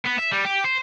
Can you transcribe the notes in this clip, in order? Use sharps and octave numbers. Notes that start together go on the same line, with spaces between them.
B3
E5
G3
G4
C5